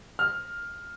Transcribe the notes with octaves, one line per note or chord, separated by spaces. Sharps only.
F6